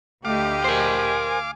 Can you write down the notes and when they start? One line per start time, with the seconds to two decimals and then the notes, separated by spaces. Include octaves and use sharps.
0.25 D2 A3 G4 D#5 F5 D6
0.64 A#4 C5 G#5